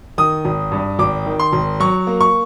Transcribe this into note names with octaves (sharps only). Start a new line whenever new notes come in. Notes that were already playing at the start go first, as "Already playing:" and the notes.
D#3 D#6
G#1
G2
G#1 D6
D#3
C6
G#1
F#3 C#6
A#3
C#6